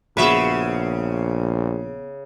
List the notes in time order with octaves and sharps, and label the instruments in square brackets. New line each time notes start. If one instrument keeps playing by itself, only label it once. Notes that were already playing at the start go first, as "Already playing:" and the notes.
[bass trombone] A#1 [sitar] C#3 E5 [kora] B3 F#4 B4